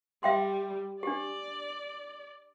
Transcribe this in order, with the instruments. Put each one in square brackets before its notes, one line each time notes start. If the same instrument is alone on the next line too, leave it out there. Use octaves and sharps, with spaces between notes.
[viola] G3 [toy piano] E5 G5 C6
[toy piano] D4 G4 [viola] D5